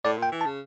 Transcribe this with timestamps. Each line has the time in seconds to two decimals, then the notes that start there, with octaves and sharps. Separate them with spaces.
0.05 A2 D5
0.17 A#2
0.23 G5
0.32 E3
0.41 A5
0.46 C#3